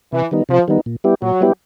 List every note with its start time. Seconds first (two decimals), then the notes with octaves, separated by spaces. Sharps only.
0.12 C3 E3
0.31 D#3 G3 B3 D#4
0.49 C3 F3
0.68 D#3 G3 B3 D#4
0.86 A#2
1.04 G3 B3 E4 G4
1.22 A#2 F#3
1.41 G3 B3 E4 G4